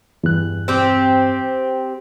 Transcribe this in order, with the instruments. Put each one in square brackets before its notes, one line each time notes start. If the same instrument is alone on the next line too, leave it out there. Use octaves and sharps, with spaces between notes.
[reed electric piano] E2 G2 F#6
[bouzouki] C4 G4